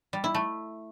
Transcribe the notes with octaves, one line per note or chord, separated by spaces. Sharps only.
G3
E4
A3